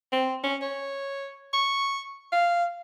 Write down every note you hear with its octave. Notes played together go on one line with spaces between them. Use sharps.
C4
C#4
C#5
C#6
F5